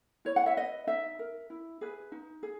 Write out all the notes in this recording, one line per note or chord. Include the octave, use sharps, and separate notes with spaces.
E4 C#5
F#5
E5
B4 D#5
D#4 E5
A#4
E4
G#4 B4
D#4
G#4